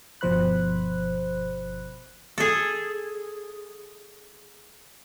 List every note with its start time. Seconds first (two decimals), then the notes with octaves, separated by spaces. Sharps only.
0.21 G1 B2 F3 C5 B5 F#6
2.38 G#4 A4